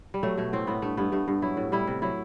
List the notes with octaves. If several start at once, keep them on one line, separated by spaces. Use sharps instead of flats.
G3
F#3 A3
B2 A3
A2 C4
A2 B3
G2 A3
G2 B3
G2 A3
G2
F#3 E4
A2
G3 E4
C3
F#3 E4